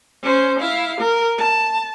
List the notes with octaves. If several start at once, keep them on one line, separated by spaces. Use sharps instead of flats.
C#4 C5
E4 F5
A#4
A5